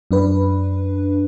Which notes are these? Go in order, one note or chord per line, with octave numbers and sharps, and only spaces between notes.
F#2 D4 B4